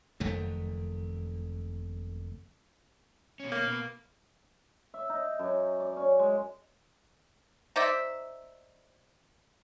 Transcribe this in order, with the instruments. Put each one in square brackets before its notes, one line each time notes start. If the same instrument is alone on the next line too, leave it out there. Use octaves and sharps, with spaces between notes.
[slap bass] F#1 F2 D#3 A3
[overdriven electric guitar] B2 C#4
[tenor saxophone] A#3
[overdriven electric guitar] B2
[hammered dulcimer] E5
D#4
F#2
D5
C#4
G#3
[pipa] D#4 C5 D5 E5